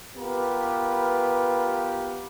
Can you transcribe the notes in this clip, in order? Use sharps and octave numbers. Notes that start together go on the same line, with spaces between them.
B3 F4 G4 A#4 B4